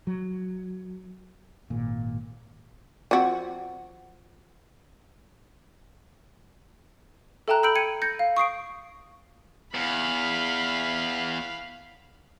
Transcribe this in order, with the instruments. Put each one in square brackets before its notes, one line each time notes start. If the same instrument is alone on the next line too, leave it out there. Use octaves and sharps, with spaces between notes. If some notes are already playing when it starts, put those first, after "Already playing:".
[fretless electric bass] F#3
G#1 A#2
[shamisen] F3 C4 F#4
[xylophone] A4 E5 G5 A5 A#5 F#6
B5 E6 G6 D7 F#7
G5 G#6 C#7 D#7
G6 G#6 A#6 C#7
F5
C#6 D#6 C7 D7
[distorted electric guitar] E2 [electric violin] F5 B5